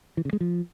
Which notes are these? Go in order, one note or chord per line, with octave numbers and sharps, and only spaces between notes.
E3
C#3
G#3
F3